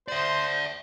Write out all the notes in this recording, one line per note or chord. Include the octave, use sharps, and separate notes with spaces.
C5 D5 E5